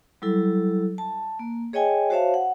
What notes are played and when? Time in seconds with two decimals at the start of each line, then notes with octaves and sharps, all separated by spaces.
0.22 F#3 G3 E4 A4
0.98 A5
1.39 A#3
1.73 G#4 C#5 D#5 G5 G#5
2.10 F#4 C5 C#5 E5 F5 A5
2.34 F#5